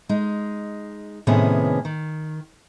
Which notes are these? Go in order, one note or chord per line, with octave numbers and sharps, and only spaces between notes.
G#3 D#4
A2 C3 D#3 B3 C#4 G#4
D#3